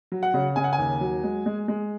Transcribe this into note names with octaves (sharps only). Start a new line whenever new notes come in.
F#3
F#5
C#3
C#3 G#5
F#5
G#5
D#2
F#3
G#3
G#3
G#3